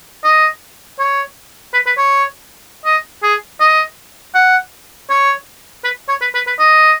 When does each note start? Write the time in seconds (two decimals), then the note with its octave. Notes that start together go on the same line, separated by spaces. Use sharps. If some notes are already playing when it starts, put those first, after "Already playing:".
0.24 D#5
0.99 C#5
1.73 B4
1.86 B4
1.98 C#5
2.85 D#5
3.23 G#4
3.60 D#5
4.34 F#5
5.10 C#5
5.84 B4
6.09 C#5
6.21 B4
6.34 B4
6.47 B4
6.59 D#5